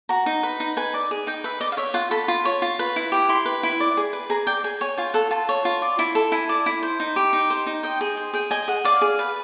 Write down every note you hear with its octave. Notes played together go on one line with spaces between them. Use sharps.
F#4 A#5
D#4
B4
D#4
B4 G#5
D5
G#4
D#4 G5
B4 E5
D5 D#5
F5
C#5 E5
F4 F#5
A4 B5
F4
C#5
F4
B4
E4
G4
E4 C6
B4
E4
D5
G#4
B4
G#4 A#5
D5 G5
G#4 G#5
C#5 G#5
F4 G#5
A4 F#5
F4 A5
C#5
F4
D5
E4
A4
E4 G#5
D5
E4
C5
D#4
G4
D#4
C5
D#4
D#5 G5
G#4
C5
G#4 G5
D#5 G#5
G#4 F#5
D5 F5
G#4
B4